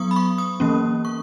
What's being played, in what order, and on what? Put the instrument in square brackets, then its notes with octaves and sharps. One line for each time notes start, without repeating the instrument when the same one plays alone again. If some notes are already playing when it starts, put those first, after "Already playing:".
Already playing: [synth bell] F#3 B3 C#6 D#6
B5
C#6
D#6
E3 A#3 C#4
C#6